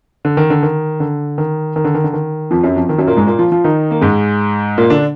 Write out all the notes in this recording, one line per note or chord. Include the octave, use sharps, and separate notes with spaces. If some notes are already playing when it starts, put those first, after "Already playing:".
D3
D#3
D3
D#3
D3
D#3
D#3
D3
D#3
D3
D#3
F2 F3
F#2 F#3
F2 F3
D#3
F#2 F#3
A#2 A#3
G#2 G#3
A#2 A#3
F3 F4
F3 F4
D#3 D#4
A#3
G#2 G#3
A#2 A#3
D3 D4